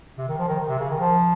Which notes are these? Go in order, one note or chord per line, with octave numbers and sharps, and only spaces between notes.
C3
D#3
F3
D#3
D#3
C3
C#3
D#3
F3